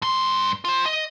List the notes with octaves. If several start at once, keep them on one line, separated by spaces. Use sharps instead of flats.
G2 C6
F4 C5
D#5